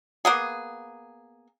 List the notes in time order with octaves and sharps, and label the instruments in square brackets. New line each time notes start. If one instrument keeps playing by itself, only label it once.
[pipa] A#3 B3 G#4